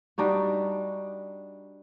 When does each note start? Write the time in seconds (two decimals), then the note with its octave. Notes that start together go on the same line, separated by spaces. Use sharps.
0.18 G3 D4 D#4 F#4